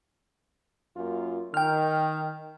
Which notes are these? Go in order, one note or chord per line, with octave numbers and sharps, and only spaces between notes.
F#2 A#3 F4
D#3 G5 F6